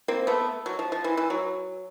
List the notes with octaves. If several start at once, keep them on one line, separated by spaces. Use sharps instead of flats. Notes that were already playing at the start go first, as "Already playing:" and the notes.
A#3 C4
A3 B3
F#3
F3
F3
E3
E3
F#3